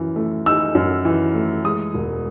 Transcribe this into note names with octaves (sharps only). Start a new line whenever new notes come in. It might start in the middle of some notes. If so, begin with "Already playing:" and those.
Already playing: F#2 E3
A3
D#4 E6
F#2
E3
A3
G#3 D#6
E1